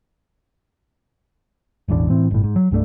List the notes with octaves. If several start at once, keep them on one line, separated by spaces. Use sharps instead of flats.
E1 A1 E2 D4
A2 E3 C4
G1 A2
G#2
F#3
C2 G2 A3 D4